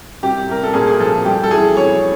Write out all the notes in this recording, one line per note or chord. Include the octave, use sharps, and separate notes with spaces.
C2 G4
C2 A#4
A4
A#2 G#4
G#4
F3 A4
G2 G4
A4
E3 G#4
E3 C#5